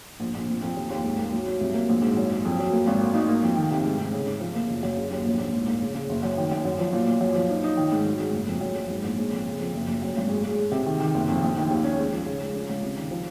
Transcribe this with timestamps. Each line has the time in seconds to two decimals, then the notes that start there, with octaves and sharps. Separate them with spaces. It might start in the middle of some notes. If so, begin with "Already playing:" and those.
0.20 A#1
0.35 A#1
0.48 F2
0.62 F2
0.76 D#2
0.90 D#2
1.04 G#2
1.18 A#3
1.32 F#3
1.46 F#3
1.61 C2
1.74 A#3
1.89 A#1
2.02 G#2
2.17 F#2
2.30 F#2
2.45 F2
2.58 F#3
2.72 A#3
2.87 G#1
3.01 A#3
3.14 D#4
3.29 A#3
3.43 F2
3.57 D#3
3.71 C3
3.85 G#2
3.98 G#2
4.12 C#3
4.27 C#3
4.40 F3
4.55 A#3
4.69 F#1
4.83 F#2
4.97 C#3
5.10 D#2
5.25 A#1
5.39 A#1
5.53 G#2
5.68 A#3
5.82 C#3
5.95 C#3
6.09 F#1
6.23 F#2
6.38 D#3
6.52 F#2
6.65 F#2
6.79 F3
6.93 A#2
7.07 A#2
7.21 F#2
7.36 F3
7.50 D#4
7.64 D#4
7.77 D#3
7.92 G#2
8.06 F#3
8.20 G#2
8.33 F#1
8.48 F2
8.61 F#2
8.76 F#2
8.90 G#2
9.04 A#1
9.18 G#3
9.32 F2
9.46 C#3
9.59 F2
9.74 F#1
9.87 F#1
10.03 F#2
10.17 G#1
10.29 G#3
10.44 G#3
10.57 G#3
10.72 C3
10.86 D#3
11.00 D#3
11.14 F#1
11.28 F2
11.42 A#1
11.57 D#3
11.70 D#2
11.84 C#4
11.98 G#3
12.12 F3
12.26 C#3
12.41 G#3
12.55 C#4
12.69 C#2
12.83 C3
12.97 D#3
13.11 F3